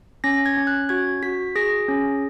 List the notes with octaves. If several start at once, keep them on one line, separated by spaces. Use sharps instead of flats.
C#4 A#6
G#6
C#4
F#6
F#4 G#6
F#4 B6
G#4 A#6
C#4